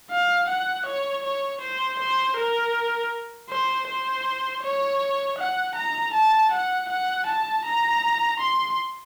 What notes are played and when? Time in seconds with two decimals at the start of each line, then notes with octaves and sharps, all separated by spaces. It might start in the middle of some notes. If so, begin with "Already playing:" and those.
0.11 F5
0.48 F#5
0.86 C#5
1.23 C#5
1.61 C5
1.99 C5
2.37 A#4
3.50 C5
3.87 C5
4.62 C#5
5.38 F#5
5.76 A#5
6.14 A5
6.52 F#5
6.89 F#5
7.27 A5
7.65 A#5
8.40 C6